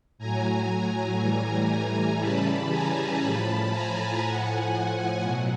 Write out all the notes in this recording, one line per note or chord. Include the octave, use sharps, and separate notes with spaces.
A2 F#3 G#5 A#5
A2 E3 G3 G#5 A#5
G#5 A#5
C#3 E3 G3 A5 B5
G#5 A#5
A2 F3 A5 B5
G#5 A#5
A2 F3 F#5 G#5
B2 F#3